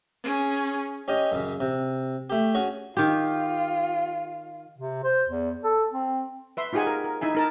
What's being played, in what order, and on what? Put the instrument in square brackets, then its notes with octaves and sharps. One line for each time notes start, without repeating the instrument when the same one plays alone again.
[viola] C#4 G#4
[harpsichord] C#4 G4 C#5 D#5
F#2 C#3
C3
A3 G4
C#4 F#4 G#4
[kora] D#3 G4 [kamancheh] F4
[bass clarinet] C3
C5
E2
A4
C4
[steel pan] B4 E5 C6
D#4 F4 G4 G#4 F#5 G#5
A#4
A#4
D#4 E4 E5 G#5
D#4 A#4 A5